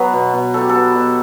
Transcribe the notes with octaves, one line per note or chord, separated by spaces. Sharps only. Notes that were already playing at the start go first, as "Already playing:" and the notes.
Already playing: F#3 B3 B4
B2
B2
F#3 A4
G4
A4
B3
B2